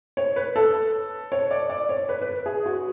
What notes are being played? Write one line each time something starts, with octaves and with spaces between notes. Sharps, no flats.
C#5
B4
A4
C#5
D5
D5
C#5
B4
B4
G#4
F#4